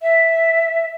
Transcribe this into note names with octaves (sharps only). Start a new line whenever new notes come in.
E5